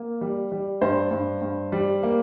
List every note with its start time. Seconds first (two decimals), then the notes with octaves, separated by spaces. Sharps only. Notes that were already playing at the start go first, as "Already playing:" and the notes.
Already playing: A#3
0.21 G3
0.52 G3
0.81 G2 C5
1.11 G2
1.42 G2
1.72 G3
2.03 A#3